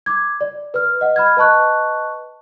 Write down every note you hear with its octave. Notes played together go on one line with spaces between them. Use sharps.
D6 G#6
D5
B4 F6
D#5 F#5
B5 F6 G#6
B4 D#5 A5 C#6 F#6